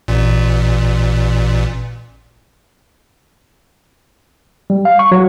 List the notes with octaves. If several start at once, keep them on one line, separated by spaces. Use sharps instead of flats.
A1 A#2
G3
F5
C#6
F#3